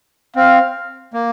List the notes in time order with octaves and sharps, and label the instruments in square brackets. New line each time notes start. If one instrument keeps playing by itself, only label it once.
[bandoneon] C4 [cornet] F5
[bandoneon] A#3